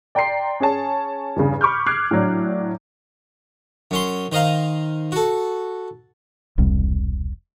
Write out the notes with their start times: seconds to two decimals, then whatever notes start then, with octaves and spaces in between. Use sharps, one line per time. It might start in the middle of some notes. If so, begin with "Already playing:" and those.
0.15 D5 G5 A#5 C6 C7
0.60 C#4 G#4 C#5 A5
1.36 E2 G2 C#3
1.61 B5 C#6 D6 F6 G6
1.86 D6 F6 F#6 G#6 C7
2.11 A2 F#3 D4
3.91 F#2 C#4 C6
4.32 D#3 C5 D#5 F5 A#5
5.12 F#4 A4
6.58 E1 C2 C3 G3